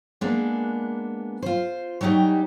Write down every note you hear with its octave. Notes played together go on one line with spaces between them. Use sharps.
G#3 A#3 B3 D4
F4 C5
F#3 G3 C#4 D#4 G4